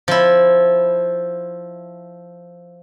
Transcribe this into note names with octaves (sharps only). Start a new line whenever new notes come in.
F3 E4